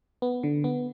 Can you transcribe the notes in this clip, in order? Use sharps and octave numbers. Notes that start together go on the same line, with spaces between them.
B3
D3
B3